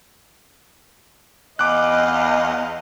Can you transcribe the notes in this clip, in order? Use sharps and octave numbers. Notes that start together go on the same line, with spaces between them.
E2 D#5 F5 D6 F#6